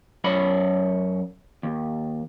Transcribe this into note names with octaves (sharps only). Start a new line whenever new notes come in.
F#2 C#5 D5 B5
D#2